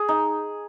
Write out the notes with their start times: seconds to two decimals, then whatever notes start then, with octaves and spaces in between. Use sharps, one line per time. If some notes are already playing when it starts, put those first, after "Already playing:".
Already playing: G#4
0.09 D#4